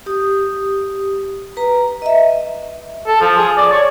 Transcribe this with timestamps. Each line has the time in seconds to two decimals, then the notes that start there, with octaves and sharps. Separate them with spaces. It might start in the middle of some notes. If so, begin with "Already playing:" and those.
0.06 G4 D#6
1.57 B4 A#5
2.02 D#5 E5
3.07 A4
3.21 F3
3.37 G#4
3.57 D5
3.72 C#5